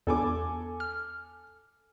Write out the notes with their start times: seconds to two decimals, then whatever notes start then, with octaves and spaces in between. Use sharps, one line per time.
0.07 E2 A4 G#5 D6
0.80 F6